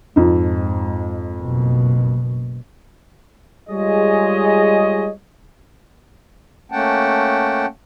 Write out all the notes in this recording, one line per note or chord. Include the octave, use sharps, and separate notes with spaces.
F2 G#2 D#4
F#1 B2
G3 G#3 F4 G#4 C#5 D#5
A3 A#3 C#4 F#5 G5 A5